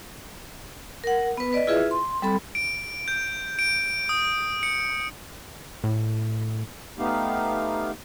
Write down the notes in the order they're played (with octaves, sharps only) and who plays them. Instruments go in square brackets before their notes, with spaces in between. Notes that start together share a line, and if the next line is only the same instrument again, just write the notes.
[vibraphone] A#4 F#5
B3 B4
B4 D5 D#5
E4 F4 G#4 B4 E5
C6
G3 C4 A4 B5
[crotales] D7
G6
D7
D#6
C#7
[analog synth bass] A2
[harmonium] A3 B3 D#4 G4 F5